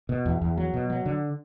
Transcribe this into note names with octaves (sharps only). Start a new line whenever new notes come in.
B2
E2
E2
F#3
B2
F#3
D3